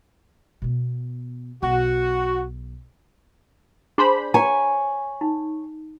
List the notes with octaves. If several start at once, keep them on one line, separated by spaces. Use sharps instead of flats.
B2 B3
B1 F#4
D4 G#4 C5 G#5 B5
C#5 G#5 A#5
D#4